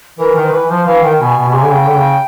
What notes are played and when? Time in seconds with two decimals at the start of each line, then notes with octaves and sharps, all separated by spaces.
0.19 E3 A#4
0.36 D#3
0.45 C5
0.49 E3 B4
0.69 F3 C5
0.86 E3 F5
1.03 D#3 G5
1.20 B2 G#5
1.37 B2
1.48 B2
1.54 C3
1.63 D3
1.70 C#3 G5
1.86 D3
1.96 C#3